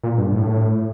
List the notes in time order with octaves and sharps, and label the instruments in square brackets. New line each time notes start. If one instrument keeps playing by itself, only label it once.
[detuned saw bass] A#2
G2
A2